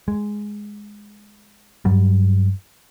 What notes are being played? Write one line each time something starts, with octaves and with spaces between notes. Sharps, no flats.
G#3
G2 F#3 G3